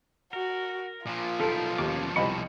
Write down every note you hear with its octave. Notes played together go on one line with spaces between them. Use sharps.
F#4 A#4
A#2 F3 F4
B1 F3 D#4 E4 A4 A#4
D#2 C#4 C#5 D6
C2 D#5 A5 B5 C#6